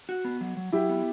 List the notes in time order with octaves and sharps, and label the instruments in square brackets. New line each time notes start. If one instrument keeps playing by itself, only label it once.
[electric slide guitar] F#4
B3
F#3
F#3
[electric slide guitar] F#3 [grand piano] E4 G4
[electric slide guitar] B3